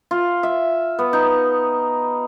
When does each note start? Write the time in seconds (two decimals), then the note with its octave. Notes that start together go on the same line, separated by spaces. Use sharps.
0.11 F4
0.43 E5
0.99 B3
1.13 D#4